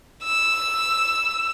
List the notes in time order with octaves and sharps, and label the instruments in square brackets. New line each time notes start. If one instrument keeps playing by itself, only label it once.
[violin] E6